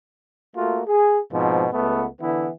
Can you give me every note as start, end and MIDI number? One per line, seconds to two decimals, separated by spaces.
0.56 0.81 57
0.56 0.81 58
0.56 0.81 65
0.56 0.81 66
0.86 1.19 68
1.32 1.66 44
1.32 1.66 47
1.32 1.66 53
1.32 1.66 60
1.72 2.06 37
1.72 2.06 57
1.72 2.06 59
2.20 2.49 50
2.20 2.49 52
2.20 2.49 59
2.20 2.49 64